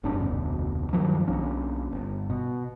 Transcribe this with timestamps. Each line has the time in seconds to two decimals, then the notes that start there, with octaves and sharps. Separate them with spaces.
0.03 F#1 G2 C#4 D4
0.19 F1 D2 B2
0.93 G2 D#3 F3 F#3
1.27 B1 A#3 C#4 D4
1.92 G1
2.30 B2